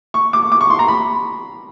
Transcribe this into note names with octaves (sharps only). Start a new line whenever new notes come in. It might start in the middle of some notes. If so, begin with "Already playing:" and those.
C#6
D6
D6
C#6
C6
A#5
B5